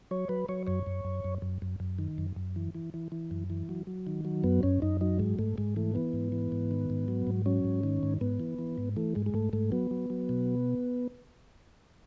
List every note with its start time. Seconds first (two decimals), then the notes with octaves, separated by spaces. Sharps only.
0.11 F#3 C#5
0.29 F#3 B4
0.49 F#3 C#5
0.67 F#2 C#5
0.86 F#2
1.05 F#2
1.24 F#2
1.42 F#2
1.62 F#2
1.80 F#2
1.99 D#3
2.18 F#2
2.36 F#2
2.56 E3
2.74 E3
2.94 E3
3.12 E3
3.31 F#2
3.50 E3
3.69 F#3
3.87 F#3
4.07 D#3
4.25 F#3
4.44 F#2 B3
4.63 F#2 C#4
4.82 F#2 D#4
5.01 F#3 D#4
5.19 G#2 G#3
5.39 G#2 A3
5.58 G#2 G#3
5.76 E3 A3
5.95 E3 B3
6.13 G#2
6.32 E3
6.52 G#2
6.71 D#3
6.90 G#2
7.08 F#3
7.27 G#2
7.46 F#3 C#4
7.64 G#2
7.83 D#3
8.03 G#2
8.21 G#2 B3
8.40 E3
8.58 E3
8.78 G#2
8.97 E3 A3
9.15 G#2 G#3
9.26 G#3
9.34 G#2 A3
9.53 G#2 A3
9.72 F#3 B3
9.91 F#3
10.10 F#3
10.29 B2